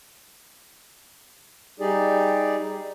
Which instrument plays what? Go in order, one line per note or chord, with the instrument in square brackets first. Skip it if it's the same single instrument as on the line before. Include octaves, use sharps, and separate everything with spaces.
[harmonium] G3 D#4 G4 G#4 D5